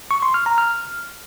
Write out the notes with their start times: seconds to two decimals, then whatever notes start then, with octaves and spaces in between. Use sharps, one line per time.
0.11 C#6
0.22 C6
0.34 F6
0.46 A#5
0.58 F6